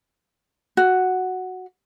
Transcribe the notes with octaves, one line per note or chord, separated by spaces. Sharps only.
F#4